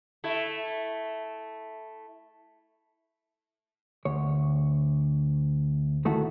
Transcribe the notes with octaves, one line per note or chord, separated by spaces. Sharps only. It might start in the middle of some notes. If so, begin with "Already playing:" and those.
A3 E4
D2 C#5
D#3 A3 E4 F#4 A4